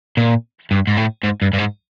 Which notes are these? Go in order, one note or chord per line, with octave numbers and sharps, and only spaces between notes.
A#2
G2
G#2
A2
G#2
G2
G2
G#2